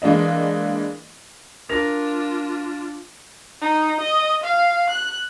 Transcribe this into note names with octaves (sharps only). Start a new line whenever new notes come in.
E3 G#3 A#3 D4 D#5
D4 F4 A#4 A#6 F7
D#4
D#5
F5
F#6